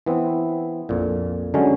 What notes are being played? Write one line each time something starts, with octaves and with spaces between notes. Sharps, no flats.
E3 B3 C4
A#1 F2 A#2
D3 F#3 G#3 C#4